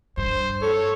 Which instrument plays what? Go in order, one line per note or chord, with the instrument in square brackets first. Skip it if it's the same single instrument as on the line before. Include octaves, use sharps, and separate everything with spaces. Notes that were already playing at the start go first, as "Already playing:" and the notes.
[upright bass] G2 [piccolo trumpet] C5
[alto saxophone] A4 [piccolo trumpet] C#5